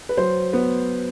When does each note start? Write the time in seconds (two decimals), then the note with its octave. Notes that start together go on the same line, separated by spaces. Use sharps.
0.09 B4
0.17 F#3 C5
0.53 B3